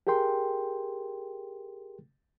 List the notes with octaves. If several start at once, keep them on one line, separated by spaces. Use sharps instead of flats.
G4 G#4 A#4 G5 C6